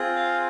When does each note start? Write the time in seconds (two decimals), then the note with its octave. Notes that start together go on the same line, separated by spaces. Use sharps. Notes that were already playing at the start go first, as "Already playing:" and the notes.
Already playing: C4 F4 G#4
0.16 F5